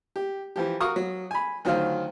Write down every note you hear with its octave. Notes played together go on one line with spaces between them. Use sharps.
G4
E3 F3 G4
F#4 A#4 F5 C#6 D#6
F#3
G#5 B5
D2 D#3 F#3 F4 C5 F5